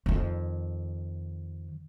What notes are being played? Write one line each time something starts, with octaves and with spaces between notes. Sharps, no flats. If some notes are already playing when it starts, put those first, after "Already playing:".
F2 D#3